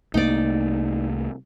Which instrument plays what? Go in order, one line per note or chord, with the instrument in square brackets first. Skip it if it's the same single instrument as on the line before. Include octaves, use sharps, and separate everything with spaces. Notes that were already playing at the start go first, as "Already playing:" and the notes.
[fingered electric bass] C2 A3 A#3 [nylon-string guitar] D#4 D5